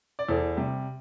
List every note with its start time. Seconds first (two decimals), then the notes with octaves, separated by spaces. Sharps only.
0.19 D5
0.29 E2 A4 C5
0.57 C3 G3